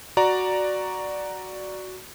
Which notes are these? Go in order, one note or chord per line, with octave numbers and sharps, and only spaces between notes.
F#4 D5 A#5